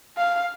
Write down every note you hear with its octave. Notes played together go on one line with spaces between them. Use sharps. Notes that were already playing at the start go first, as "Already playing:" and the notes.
F5